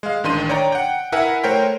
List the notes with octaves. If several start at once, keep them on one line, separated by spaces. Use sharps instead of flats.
G#3 F5
A1 D#3 D4 C6 D#7
C#5 D5 G5 A#5
F#5 G5
E4 A#4 B4 E5 F#5 G#5
A3 A#4 C5 C#5 G5